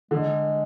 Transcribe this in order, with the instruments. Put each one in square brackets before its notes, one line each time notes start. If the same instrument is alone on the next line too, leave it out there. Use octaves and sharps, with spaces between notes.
[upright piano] D3 [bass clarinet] G#3